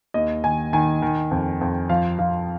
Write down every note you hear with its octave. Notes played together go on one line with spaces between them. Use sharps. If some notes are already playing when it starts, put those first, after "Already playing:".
D#2 D#5
D#3 G#5
D#3 G#5
D#3
F2
F2
F3 F5
F3 F5